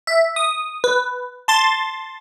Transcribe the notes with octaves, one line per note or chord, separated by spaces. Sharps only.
E5
D#6
B4
A5 C6 A6